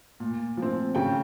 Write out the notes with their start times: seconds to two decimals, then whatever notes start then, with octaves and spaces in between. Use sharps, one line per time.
0.20 A#2
0.57 F3
0.62 C4
0.95 C#3 G5